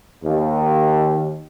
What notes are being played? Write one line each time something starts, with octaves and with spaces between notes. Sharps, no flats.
D#2